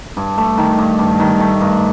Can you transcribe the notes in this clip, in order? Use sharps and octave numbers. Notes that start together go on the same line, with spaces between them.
G2
A3
D#3
G2
G2
D#3
A3
G2